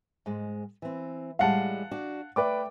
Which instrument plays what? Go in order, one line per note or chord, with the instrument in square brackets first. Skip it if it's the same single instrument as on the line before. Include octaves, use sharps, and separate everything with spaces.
[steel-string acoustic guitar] G#2 G#3
E3 C4
[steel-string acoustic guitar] A2 G3 G#3 [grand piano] F5 F#5 A5
[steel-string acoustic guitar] D4 F#4
[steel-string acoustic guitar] A3 G5 [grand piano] B4 D5 D6